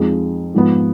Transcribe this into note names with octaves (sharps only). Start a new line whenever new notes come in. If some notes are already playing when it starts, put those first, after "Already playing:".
Already playing: F2 F3 G#3 D#4
G#2 F3 B3